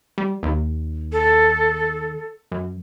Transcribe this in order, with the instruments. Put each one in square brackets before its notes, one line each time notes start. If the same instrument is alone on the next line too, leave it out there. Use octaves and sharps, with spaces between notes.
[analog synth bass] G3
D#2
[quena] A4
[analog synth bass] F#2